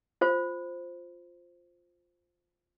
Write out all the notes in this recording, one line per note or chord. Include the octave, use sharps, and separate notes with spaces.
F4 C5